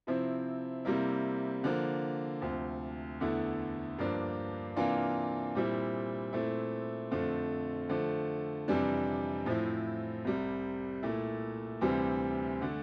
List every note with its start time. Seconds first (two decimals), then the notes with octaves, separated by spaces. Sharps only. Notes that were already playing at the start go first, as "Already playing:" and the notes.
0.07 C3 F3 C4 E4
0.85 C3 G3 A#3 E4
1.64 D3 F3 A#3
2.41 D2 C3 F3
3.20 E2 D3 A3 E4
3.99 G2 F3 A#3 D4
4.76 C3 E3 A#3 D4 F4
5.55 A#2 G3 C4 E4
6.33 A#2 A3 C4 E4
7.11 F2 D3 F3 A3 C4
7.89 D3 F3 A3
8.68 F2 C3 E3 G3 D4
9.46 A2 F3 C4 E4
10.24 C2 C3 G3
11.03 A#2 A3 E4
11.81 D2 C3 E3 G3 C4
12.62 D3 A3